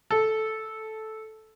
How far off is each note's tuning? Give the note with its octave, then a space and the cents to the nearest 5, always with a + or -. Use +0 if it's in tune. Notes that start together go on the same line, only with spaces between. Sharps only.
A4 -10